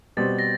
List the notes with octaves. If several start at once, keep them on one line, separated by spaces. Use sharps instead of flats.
B2 G3 C4 A6
A#6